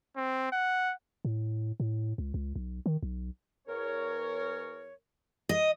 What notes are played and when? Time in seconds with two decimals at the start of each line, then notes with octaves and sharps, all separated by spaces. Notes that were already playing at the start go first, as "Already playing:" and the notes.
0.16 C4
0.52 F#5
1.25 A2
1.80 A2
2.18 C#2
2.34 C#2
2.56 B1
2.86 D#3
3.03 B1
3.67 E2 A#4 C#5
5.49 D#5